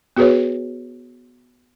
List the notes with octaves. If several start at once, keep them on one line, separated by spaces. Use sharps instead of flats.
B3 F#4 G#4 B4 C#5